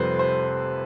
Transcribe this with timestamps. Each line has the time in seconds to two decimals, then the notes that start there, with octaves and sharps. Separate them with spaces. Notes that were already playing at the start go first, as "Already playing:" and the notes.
Already playing: F1 F2 C3 G3 B4 C5
0.19 C5